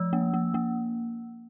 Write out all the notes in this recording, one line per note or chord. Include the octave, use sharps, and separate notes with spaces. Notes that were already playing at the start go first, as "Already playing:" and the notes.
Already playing: F3 E6
A#3
A#3
A#3